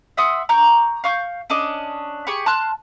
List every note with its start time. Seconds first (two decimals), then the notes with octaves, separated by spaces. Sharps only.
0.17 E5 F#5 C6 D#6
0.49 A#5 C#6 D6 G6
1.04 F5 C#6 G6
1.50 C#4 D4 D#5 D6
2.27 G4 G#4 B5 C#6
2.46 A5 C6 F6 F#6